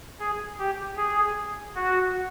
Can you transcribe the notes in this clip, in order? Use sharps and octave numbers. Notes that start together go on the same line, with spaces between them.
G#4
G4
G#4
F#4